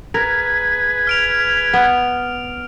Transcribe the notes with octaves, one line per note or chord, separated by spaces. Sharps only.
G#4 A#4 B4
F6 D7 F7
B3